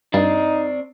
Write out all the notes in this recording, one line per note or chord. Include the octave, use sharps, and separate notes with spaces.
G2 C4 D#4 D5